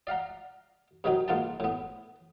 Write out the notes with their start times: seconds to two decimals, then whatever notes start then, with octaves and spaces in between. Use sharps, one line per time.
0.07 D5 F5 F#5 A#5
1.04 G2 C3 D#3 F#3 D#4
1.28 G#2 A#3 F4 F#5 A5
1.60 A2 B3